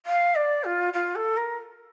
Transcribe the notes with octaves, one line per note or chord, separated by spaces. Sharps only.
F5
D5
F4
F4
A4
A#4